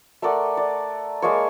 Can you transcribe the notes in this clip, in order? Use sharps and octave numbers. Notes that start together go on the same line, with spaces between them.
A3 A#4 D5 F#5
D5
G#3 A#3 C#5